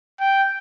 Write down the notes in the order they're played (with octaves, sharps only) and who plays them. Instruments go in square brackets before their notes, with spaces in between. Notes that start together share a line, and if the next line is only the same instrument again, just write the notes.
[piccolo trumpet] G5